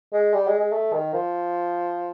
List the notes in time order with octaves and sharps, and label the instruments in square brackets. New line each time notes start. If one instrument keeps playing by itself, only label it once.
[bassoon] G#3
G3
G#3
G#3
A3
D#3
F3